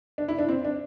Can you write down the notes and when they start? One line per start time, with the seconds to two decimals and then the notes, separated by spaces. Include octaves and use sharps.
0.18 D4
0.28 E4
0.39 D4
0.49 C4
0.65 D4